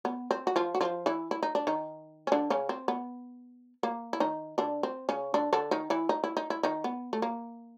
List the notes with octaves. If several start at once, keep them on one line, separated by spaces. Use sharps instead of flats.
B3
C4
F#4
F3 F4
F#4
F3 F4
E3 E4
E4
D#4
D4
D#3 D#4
C#4
D3 D4
C#3 C#4
C4
B3
A#3
E4
D#3 D#4
D3 D4
C4
C#3 C#4
D3 D4
D3 D4
D#3 D#4
E3 E4
D#4
E4
D#4
E4
D#3 D#4
B3
A3
A#3